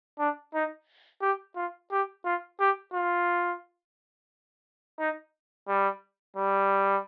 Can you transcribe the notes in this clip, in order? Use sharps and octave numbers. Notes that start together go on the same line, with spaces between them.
D4
D#4
G4
F4
G4
F4
G4
F4
D#4
G3
G3